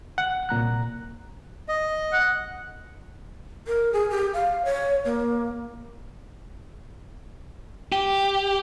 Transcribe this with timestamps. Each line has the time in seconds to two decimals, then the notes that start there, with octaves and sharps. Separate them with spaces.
0.18 F#5
0.49 C2 A#2 A#5 F#6
1.68 D#5
2.13 F#5
3.67 A#4
3.93 G#4
4.10 G4
4.34 F5
4.65 C#5
5.05 A#3
7.92 G4